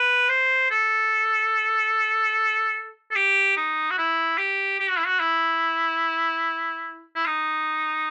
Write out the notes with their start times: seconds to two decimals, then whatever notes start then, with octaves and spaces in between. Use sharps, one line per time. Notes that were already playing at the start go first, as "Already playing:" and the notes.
Already playing: B4
0.29 C5
0.71 A4
3.11 A4
3.15 G4
3.57 D#4
3.91 F#4
3.98 E4
4.38 G4
4.80 G4
4.89 F#4
4.99 E4
5.07 F#4
5.20 E4
7.15 E4
7.26 D#4